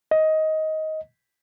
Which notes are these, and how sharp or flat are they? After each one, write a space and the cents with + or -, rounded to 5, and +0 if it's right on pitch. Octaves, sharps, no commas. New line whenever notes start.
D#5 +15